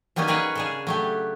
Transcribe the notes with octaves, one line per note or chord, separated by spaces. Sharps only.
F#3 G3 A#3 B3 C#4 D#4
F#4 G#4 A#4 B4 C#5
C#3 D4 G#4
F#3 A3 G4